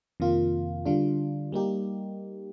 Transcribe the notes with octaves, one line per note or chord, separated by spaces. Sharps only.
F2 C3 D#3 A#3 F4
D3 G3 D4 F4
G3 A#3 D#4 G4